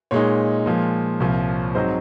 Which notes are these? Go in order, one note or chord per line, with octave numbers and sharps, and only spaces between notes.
A#2 G#3 D#4 C#5
A#2 F3 G#3
C2 A#2 F3
G#2 F#3 C4 C5 D#5